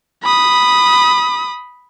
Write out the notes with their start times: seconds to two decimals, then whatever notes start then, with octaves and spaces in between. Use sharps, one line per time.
0.24 B5 D#6